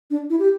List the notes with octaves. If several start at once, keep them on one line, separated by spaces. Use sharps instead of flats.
D4
E4
G4